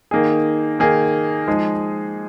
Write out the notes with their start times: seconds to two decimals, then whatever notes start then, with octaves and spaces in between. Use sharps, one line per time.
0.11 D#3 A#3 D#4 G#4
0.79 D#3 A#3 D#4 G#4
1.48 F3 G#3 D#4 G#4